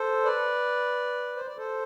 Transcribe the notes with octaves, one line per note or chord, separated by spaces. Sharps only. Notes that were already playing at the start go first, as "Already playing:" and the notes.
Already playing: A4 C5
B4 D5
C5
D5
A4 C5